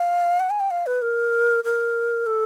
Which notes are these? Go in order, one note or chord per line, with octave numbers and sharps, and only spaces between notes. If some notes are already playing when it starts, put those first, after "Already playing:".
Already playing: F5
F#5
G#5
G5
F5
B4
A#4
A#4
A4